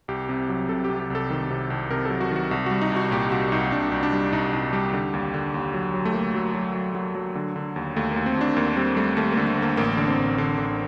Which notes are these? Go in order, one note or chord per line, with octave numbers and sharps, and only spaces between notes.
C2 G4
C3
F#3
C3 A4
G4
C3
G4
C2 A4
D#3
C3
C2
C3 A#4
A4
F#3
F#4
D#3
F#4
C2 F#4
F#4
G3
D#4
C2 F#4
A#2 G4
C2 F#4
C2 D#4
C2 D4
C2
D4
G3
C2 D#4
C2 D#4
G3 G4
D3
D#2
D3
D#2
F#3
F#3
A3
F#3 A#3
F#3
F#3
F#3
F#3
F#3
D3
D3
D#2
D#2 A3
A#3
D#2
C4
D#2 D4
D#2 A#3
G3 C4
G3 A3
D#2 A3
A#3
D3
A3
D3 A#3
A1 A#3
D3
C4
A1
D3
D3